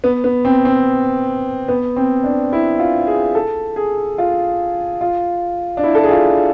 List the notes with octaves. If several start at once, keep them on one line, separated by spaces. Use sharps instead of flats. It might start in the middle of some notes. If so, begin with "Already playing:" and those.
B3
B3
C4
C4
B3
C4
D4
E4
F4
G#4
A4
G#4
F4
F4
D4
E4
A4
G#4
F4